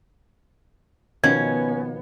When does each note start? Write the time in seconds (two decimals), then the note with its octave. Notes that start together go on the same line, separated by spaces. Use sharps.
1.24 B2 D#3 F3 B3 C#4 G#6